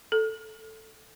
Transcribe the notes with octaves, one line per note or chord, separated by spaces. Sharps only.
A4